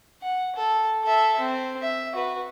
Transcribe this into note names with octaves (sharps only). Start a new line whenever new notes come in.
F#5
A4
A4 E5
C4
E5
F#4 B4